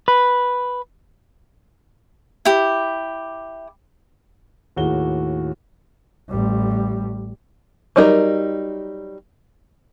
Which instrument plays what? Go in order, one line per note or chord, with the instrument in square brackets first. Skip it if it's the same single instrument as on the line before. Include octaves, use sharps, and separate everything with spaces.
[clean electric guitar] B4
[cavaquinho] E4 G4
[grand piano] D#2 A2 F#4 G#4 G7
[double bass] A1 G3
[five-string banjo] F#3 G3 D#4 F4 A#4